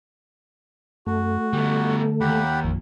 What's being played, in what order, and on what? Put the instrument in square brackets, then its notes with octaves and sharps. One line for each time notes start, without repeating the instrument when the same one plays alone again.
[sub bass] F#2 [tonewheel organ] A3 [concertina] F#4
[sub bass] D3 [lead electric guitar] G3 B3
[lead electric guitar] D#2 [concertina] G4 F#5 B5
[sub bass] A1 [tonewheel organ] F2